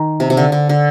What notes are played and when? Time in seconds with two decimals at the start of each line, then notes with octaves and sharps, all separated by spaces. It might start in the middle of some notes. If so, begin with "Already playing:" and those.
Already playing: D#3
0.20 C3
0.30 C3
0.37 D3
0.52 D3
0.69 D3